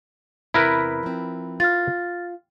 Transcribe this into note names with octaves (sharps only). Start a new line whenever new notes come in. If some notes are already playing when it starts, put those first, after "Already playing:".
E2 C3 E4 A#4 B4
F3 C4
F4 F6 A6